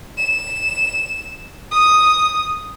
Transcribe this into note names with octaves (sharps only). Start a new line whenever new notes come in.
E7
D#6